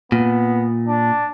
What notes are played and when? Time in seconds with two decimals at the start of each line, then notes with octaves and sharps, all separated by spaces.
0.12 A#2 B3
0.88 D4